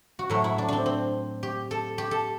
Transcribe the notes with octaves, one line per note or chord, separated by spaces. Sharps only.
F#4
A2 F#3 A3 E4
E4
D4
C4 D4
C4
G4
A4
G4
A4